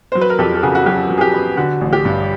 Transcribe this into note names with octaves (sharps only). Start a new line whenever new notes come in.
F#3 C5
B4
A#4
F2 G4 A4
A4
C#3 F#4 G#4
F#4
F#3 G4
F#3
G#4
G4
B3
D3 F#4
A1
G4
G2